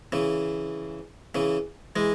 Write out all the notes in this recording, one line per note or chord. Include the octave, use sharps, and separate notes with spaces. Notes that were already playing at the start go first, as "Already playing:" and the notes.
C#3 E3
C#3 E3
E3 G#3